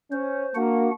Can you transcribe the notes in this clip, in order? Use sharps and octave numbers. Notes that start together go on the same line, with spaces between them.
C#4 C5
A#3 D4 F#4 F#5